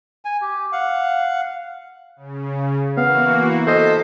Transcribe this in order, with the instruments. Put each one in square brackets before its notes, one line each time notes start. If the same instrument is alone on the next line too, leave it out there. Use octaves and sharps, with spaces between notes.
[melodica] G#5
G4
F5 F#5
[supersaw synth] C#3
[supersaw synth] E3 A#3 F#4 [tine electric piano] B3 [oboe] F5
[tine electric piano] A4 D#5 [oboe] C5 [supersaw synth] A5 B6